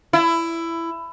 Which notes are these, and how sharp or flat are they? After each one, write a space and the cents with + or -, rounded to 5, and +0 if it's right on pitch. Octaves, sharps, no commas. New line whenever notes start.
E4 +15